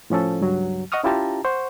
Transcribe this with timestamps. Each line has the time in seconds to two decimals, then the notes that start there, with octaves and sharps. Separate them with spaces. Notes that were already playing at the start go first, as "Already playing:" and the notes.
0.10 A2 F3 C#4 A4
0.40 C#2 G2 F#3
0.92 D#5 F#5 C#6 D#6 F6
1.03 C#4 E4 F4 G4 A5 A#5
1.45 C5 F#5 C#6